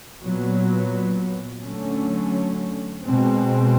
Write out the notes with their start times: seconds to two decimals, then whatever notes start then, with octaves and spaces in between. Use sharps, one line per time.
0.22 A#2 F#3 B3
1.63 D3 F#3 A3 C#4
3.04 B2 G#3 C4